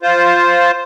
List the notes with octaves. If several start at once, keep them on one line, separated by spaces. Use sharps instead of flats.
F4 C5